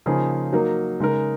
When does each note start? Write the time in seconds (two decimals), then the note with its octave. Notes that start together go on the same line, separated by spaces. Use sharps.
0.06 C#3 F3 A#3 D#4 G#4
0.53 F#3 A#3 D#4 A#4
1.00 C#3 G#3 D#4 A#4